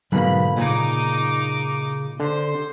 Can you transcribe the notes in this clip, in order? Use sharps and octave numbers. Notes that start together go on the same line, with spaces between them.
G#2 B2 D3 F#3 A#3 B5
A#2 C#3 D#4 D6
D3 C5